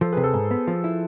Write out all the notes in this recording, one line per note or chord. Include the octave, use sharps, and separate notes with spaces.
F3 A4 C5
C3 G#4 B4
A4
G#2
B3
F3
E4